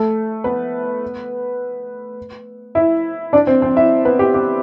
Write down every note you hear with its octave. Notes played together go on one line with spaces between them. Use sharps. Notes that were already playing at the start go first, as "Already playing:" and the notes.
Already playing: A3 A4
B3 B4
E4 E5
D4 D5
C4 C5
C4 C5
E4 E5
B3 B4
G4
G4